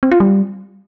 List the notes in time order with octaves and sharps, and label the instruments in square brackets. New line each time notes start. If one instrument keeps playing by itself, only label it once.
[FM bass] C4
F4
G3